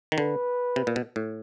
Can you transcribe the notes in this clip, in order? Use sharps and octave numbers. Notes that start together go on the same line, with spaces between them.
D#3
D3 B4
C3
A#2
B2
A2